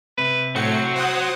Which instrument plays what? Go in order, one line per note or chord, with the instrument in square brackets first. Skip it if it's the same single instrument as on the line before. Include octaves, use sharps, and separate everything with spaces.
[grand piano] C3 [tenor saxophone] B4
[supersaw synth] A2 C#7 [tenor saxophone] C4 [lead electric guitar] F#4 C#5
[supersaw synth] C5 F#5 D#6